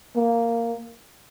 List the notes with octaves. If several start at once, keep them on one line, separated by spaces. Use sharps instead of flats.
A#3